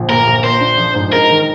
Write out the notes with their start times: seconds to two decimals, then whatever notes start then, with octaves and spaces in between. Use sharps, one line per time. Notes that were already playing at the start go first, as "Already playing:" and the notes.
Already playing: A#1 D3 F3
0.09 A#2 A#4
0.27 A#1
0.44 A#3 C5
0.61 D4
0.78 F3
0.95 G#2
1.13 D#4 A#4
1.30 D#3